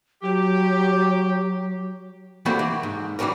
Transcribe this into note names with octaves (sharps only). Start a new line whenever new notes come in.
F#3 G4
E3 G3 A3 A#3 C4 F#4
E3
G#2
E3 F#3 G3 C#4 A#4